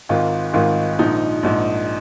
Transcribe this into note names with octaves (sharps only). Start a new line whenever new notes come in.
G#1 G#2 D#3 F4
G#1 G#2 D#3 F4
A#1 G#2 F3 D#4
A#1 G#2 F3